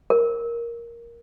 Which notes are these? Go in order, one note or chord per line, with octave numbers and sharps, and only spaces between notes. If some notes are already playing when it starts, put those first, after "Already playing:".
A#4